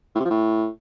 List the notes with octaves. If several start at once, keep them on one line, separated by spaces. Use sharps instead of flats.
A2
C3
F3
A2